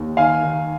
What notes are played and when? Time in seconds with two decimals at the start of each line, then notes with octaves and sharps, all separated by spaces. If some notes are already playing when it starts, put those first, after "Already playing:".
Already playing: D#2
0.17 D#3 F5 G#5
0.43 D#3